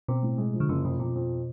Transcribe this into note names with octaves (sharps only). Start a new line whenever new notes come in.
B2 C4
A2
G#3
F3
D3
F#1 C#3
F2 C3
F2 B2
F2